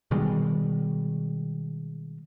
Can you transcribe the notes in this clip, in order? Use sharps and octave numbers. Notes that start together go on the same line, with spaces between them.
B2 D#3 G3 G#3